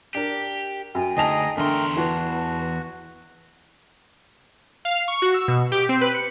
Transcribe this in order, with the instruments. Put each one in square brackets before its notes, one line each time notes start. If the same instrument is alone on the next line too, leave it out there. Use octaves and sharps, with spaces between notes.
[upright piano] D4 A#4 [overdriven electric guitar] G4
[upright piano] F#2 [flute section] G5 G#5
[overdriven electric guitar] D2 [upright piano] D#4 A5 F7 [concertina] G#4 D#5 A#5
[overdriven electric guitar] E2 C6 [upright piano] D3 [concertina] A3 A#4 [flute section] G5
[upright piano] E3 [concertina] F#4 [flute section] B4 A5
[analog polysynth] F5
C#6
F#4
E6
B2
G4
C4
B4
C#7